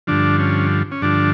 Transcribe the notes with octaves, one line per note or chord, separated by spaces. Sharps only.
G2 D3 F3 D4
C#4
C#4
G2 D3 F3 D4